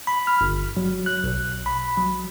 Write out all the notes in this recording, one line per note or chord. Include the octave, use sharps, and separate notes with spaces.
B5
F6
G1
F#3
F#6
B1
B5
F#3